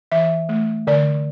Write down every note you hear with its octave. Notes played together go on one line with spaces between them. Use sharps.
E3 E5
A3
D3 D5